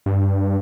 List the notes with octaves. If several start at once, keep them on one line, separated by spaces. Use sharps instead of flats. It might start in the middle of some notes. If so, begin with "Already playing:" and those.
G2